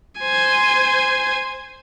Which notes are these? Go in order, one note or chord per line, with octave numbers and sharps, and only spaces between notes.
C5 G#5